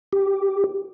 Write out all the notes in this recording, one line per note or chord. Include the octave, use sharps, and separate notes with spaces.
G4